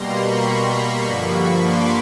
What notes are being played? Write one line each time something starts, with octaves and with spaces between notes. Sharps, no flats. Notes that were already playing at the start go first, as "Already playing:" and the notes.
Already playing: B2 G3 A#3 A#5 C6
B5 C#6
G2 D3 F3 A#3
C6 D6